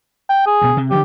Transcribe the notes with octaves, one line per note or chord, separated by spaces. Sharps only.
G5
G#4
D2 B2
C3
D3 F3 F#3 G4